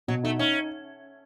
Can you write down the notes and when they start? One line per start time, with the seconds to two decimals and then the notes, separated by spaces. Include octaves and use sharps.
0.08 B2 F#3
0.24 A3 D#4
0.39 C#4 D#4